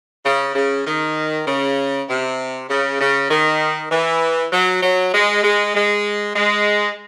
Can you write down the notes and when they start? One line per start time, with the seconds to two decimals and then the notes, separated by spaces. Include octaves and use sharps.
0.25 C#3
0.55 C#3
0.86 D#3
1.47 C#3
2.09 C3
2.70 C#3
3.00 C#3
3.30 D#3
3.91 E3
4.52 F#3
4.82 F#3
5.14 G#3
5.43 G#3
5.75 G#3
6.35 G#3